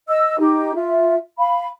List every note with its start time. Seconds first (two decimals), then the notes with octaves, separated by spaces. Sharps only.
0.08 D#5 E6
0.39 D#4 G4
0.75 F4 E5
1.38 F5 B5